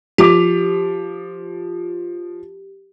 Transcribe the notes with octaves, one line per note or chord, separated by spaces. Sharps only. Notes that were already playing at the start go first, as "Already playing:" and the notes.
F3 G4 D6